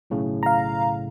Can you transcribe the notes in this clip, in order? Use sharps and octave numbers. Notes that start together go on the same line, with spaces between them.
B1 A2 C#3
F5 A#5